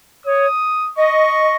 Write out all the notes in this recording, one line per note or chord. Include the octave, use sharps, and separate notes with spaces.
C#5 D#6
D#5 C#6